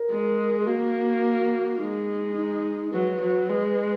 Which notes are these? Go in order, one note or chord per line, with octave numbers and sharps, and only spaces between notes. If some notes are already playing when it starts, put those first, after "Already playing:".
Already playing: A#4
G#3
G#4
A#3 F#4
G#3 D#4
D#4
F#3 B4
F#3
G#3